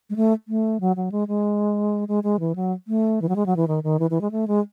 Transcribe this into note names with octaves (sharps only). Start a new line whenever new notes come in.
G#3
A3
A3
F#3
F#3
G#3
G#3
G#3
G#3
E3
F#3
A3
E3
F#3
G#3
F#3
E3
D#3
D#3
E3
E3
G#3
A3
G#3